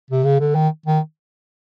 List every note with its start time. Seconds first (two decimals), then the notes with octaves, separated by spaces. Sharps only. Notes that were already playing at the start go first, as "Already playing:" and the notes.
0.10 C3
0.25 C#3
0.40 D3
0.55 D#3
0.86 D#3